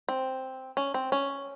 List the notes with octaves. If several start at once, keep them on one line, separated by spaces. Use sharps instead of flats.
C4
C#4
C4
C#4